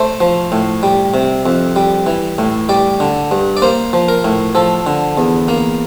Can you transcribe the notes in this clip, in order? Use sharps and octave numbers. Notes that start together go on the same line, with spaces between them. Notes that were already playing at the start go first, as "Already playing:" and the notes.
Already playing: A3 C5
F3
A2
G3
C3
F2
G3
E3
A2
G3 D5
D3
G2
D5
A#3 C5
F3
A#4
A2
F3 A4
D3
E2
A#3